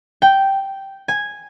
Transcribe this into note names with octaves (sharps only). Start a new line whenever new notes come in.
G5
G#5